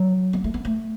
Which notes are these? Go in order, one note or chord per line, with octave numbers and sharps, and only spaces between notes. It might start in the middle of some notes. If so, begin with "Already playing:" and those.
Already playing: F#3
B3
A3
B3
A3